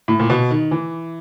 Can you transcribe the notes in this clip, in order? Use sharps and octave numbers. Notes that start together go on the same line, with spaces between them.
A2
A#2
B2
D#3
E3